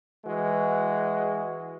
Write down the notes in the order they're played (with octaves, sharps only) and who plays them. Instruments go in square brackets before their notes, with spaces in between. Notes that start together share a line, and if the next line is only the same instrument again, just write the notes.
[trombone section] E3 G#3 F#4